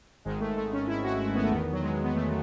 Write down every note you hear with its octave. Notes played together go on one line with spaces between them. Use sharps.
G#1 G#2 D#3 G#3
A3
A3
C#4
E4
F#4
E4
B3
A3
E2 D#3 B3
F#3
G#3
B3
A3